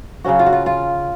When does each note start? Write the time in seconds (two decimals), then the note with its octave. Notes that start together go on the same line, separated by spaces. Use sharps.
0.24 C#3 F#3 C#4 F#4
0.39 F4
0.46 F#4
0.53 F4
0.66 F4